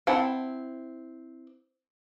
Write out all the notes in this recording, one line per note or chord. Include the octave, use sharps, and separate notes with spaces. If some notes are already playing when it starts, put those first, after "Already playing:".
C4 E4 F#5 A5